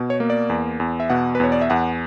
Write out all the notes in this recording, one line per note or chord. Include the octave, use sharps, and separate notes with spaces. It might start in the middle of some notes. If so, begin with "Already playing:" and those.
Already playing: B2
C#5
A#3
D5
E2
E2
E5
B2 F#5
B4
E2 C#5
D5
E5
E2 F#5